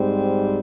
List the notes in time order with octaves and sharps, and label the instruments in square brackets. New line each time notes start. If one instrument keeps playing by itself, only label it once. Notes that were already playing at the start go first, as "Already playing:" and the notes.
Already playing: [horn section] G#2 G3 C4